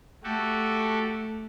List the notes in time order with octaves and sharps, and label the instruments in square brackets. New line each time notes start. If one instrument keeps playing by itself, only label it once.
[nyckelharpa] A3 [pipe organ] F#4 G4 A4